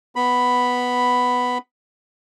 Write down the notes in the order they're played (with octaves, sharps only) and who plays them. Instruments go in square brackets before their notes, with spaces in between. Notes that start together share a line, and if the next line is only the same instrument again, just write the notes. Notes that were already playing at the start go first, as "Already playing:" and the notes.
[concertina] B3 B5